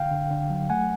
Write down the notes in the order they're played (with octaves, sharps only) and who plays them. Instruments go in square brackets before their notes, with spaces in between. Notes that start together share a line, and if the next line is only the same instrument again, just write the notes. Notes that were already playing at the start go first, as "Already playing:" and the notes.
Already playing: [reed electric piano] D3 F5 G5
D3
D3
F#3
A3 F#5 G#5